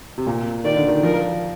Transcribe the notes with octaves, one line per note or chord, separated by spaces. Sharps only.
C3
A#2
D#3 D5
D3
D#3
F3 A#4